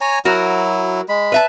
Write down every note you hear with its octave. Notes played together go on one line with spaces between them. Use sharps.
C#5 G#5 A#5
F#3 E4 F#4 A#4
G#3 B5
B4 E5 A5